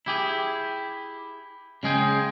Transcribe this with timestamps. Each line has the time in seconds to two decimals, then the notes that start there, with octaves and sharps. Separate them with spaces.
0.06 E4 G4 G#4
1.83 C#3 G#3 G#4 G5